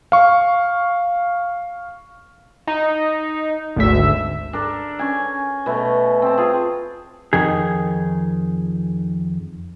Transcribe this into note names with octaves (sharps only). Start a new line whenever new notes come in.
F5 C#6
D#4
G#1 D2 E5
D4 A4 A#4
C#4 G#5
B2 A3
C4 A5
F4 G#4
F2 D#3 G#4